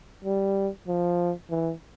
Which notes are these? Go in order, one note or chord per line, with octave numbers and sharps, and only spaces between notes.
G3
F3
E3